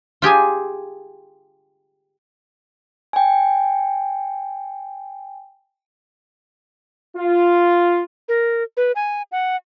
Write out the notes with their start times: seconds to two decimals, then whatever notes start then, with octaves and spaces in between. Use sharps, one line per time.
0.22 F4 G4 G#4 G#5
3.13 G5 G#5
7.17 F4
8.29 A#4
8.77 B4
8.96 G#5
9.32 F#5